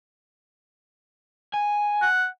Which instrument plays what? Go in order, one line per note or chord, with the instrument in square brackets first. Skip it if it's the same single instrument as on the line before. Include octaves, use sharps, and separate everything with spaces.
[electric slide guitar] G#5
[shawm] F#5